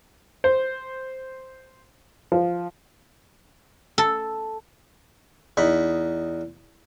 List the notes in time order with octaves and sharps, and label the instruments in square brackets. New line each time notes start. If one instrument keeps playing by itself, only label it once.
[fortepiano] C5
F3
[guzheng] A4
[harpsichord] E2 D#4 B5